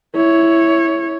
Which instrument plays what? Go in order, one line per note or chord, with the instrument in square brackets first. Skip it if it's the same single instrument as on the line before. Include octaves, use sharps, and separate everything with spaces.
[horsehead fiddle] E4 C#5